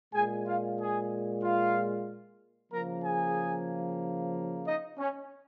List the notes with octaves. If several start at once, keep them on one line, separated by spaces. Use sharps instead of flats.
A#2 G#3 G#4 G#5
F4 F5
G#4 G#5
F4 F5
C#3 F3 A#3 A#4 A#5
G#4 G#5
D#4 D#5
C#4